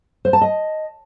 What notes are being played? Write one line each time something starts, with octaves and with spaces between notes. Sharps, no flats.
C5
A5
D#5